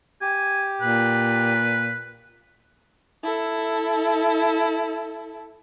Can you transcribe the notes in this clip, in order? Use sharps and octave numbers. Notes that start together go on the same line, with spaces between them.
G4 G#5
A#2 B4
E4 A4